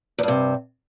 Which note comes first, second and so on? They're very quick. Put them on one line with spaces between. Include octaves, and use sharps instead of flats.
E2 G2 C3